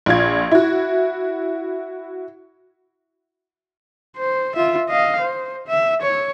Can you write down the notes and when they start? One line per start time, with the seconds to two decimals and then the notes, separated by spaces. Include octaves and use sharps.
0.06 A#1 F4 G#6
0.51 E4 F#4
4.17 C5
4.56 F4 E5
4.89 D#5 F5
5.20 C5
5.67 E5
6.01 C#5